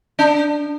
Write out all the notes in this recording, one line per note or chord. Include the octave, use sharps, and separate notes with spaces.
D4